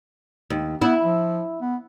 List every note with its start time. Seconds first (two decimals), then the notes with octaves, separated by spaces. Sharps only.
0.50 D#2
0.82 B3 E4
1.02 F3
1.61 B3